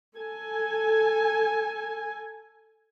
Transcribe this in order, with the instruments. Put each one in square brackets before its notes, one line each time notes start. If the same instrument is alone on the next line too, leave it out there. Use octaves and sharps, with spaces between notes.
[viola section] A4 G#5